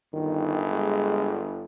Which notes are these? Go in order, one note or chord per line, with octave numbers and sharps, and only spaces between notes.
G1 D#3
G#3